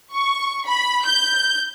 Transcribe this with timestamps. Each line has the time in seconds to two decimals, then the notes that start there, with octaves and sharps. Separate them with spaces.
0.14 C#6
0.66 B5
1.06 G6